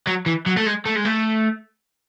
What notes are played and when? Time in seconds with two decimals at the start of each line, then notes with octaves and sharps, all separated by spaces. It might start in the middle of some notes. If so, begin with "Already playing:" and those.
0.07 F#3
0.26 E3
0.46 F#3
0.57 A3
0.66 G#3
0.86 A3
0.96 G#3
1.05 A3